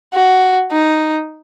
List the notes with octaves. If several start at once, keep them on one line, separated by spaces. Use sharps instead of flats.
F#4
D#4